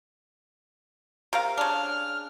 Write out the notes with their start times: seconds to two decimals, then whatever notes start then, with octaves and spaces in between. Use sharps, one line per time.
1.33 C3 A#4 F5
1.58 C#3 D4 F6